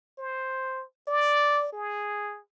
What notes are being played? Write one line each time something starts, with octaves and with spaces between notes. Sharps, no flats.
C5
D5
G#4